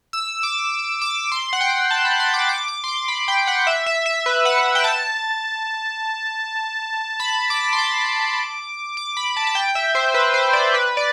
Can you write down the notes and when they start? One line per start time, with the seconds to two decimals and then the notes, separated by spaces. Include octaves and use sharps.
0.13 E6
0.43 D6
1.02 D6
1.32 C6
1.53 F#5
1.61 G5
1.91 A5
2.05 B5
2.20 C6
2.34 D6
2.49 D6
2.68 D6
2.84 C6
2.88 D6
3.08 B5
3.28 G5
3.47 F#5
3.67 E5
3.86 E5
4.06 E5
4.26 B4
4.45 F#5
4.75 G5
4.84 A5
7.20 B5
7.50 D6
7.73 C6
7.78 D6
8.97 D6
9.17 B5
9.37 A5
9.47 A5
9.55 G5
9.75 E5
9.95 C5
10.14 B4
10.34 C5
10.53 D5
10.74 B4
10.97 D5